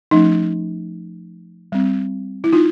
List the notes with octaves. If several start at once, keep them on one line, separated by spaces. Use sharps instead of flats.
F3 A3 C#4 D#4
G3 C4
E4
D#4 F4